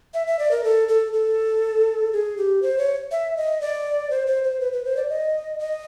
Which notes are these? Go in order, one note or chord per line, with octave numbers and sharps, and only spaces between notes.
E5
E5
D5
A#4
A4
A4
A4
G#4
G4
C5
C#5
E5
D#5
D5
C5
C5
C5
B4
B4
C5
D5
D#5
D#5